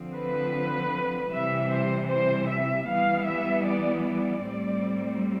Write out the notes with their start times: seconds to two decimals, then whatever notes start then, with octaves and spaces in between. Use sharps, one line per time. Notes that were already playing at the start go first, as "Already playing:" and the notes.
Already playing: D3 F3 C4
0.14 B4
1.31 C3 E3 G3 E5
1.71 C5
2.09 C5
2.49 E5
2.88 E3 G3 B3 F5
3.28 E5
3.66 D5
4.05 D5
4.44 A2 G3 C4